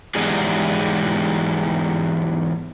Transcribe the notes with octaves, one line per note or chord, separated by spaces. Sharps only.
E2 G#2 F#3 G3 G#4